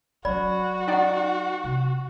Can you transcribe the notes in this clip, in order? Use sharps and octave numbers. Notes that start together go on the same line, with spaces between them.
F#3 F#4 D5 B5
D#4 D5 F#5 G5
C3